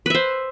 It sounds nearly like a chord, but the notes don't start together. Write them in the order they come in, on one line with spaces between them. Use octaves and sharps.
B4 E5 C5